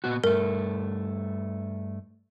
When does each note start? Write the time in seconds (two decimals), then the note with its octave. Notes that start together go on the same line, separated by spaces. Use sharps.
0.04 A#2 B3 F#4
0.24 G2 A3 A#4